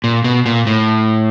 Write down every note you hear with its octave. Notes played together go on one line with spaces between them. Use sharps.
A#2
B2
A#2
A2